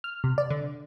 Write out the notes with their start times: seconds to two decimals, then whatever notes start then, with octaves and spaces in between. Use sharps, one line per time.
0.04 F6
0.24 C3
0.38 D5
0.50 D3